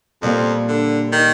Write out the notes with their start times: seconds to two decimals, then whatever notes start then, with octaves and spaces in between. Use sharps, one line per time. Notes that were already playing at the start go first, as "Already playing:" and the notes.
0.22 F2 A#2 G3 A#3
0.68 D3
1.12 D#3